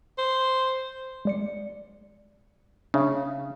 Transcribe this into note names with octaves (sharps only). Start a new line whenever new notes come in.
C5
G#3 D5 C#7
C#3 D4 E5